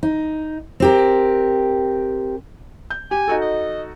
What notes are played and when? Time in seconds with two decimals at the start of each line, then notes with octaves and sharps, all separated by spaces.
0.03 D#4
0.80 C4 G4 A#4
2.90 G6
3.11 G4 G#5
3.28 D#4 F#4 A4
3.41 D#5